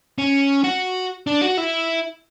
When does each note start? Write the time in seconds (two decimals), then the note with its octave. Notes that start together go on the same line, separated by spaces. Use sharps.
0.18 C#4
0.64 F#4
1.27 D4
1.41 F#4
1.57 E4